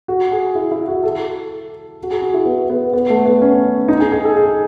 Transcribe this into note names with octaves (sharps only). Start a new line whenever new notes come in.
F#4
G#4
E4
E4
F#4
A4
F#4
G#4
F#4
E4
B3
B3
B3
A3
B3
C#4
D#4
G#4
G#4
A4
G#4